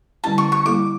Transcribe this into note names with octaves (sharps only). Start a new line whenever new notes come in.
D3 G3 C#4 E4 A5
C#6
C#6
G3 A#3 E4 A4 D6